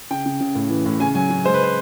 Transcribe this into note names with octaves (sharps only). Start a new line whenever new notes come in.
C#3 G5
C#3
C#3
A2
E3
A2
C#3 G#5
F#3 G#5
C#3
G#3 C5
B4
C5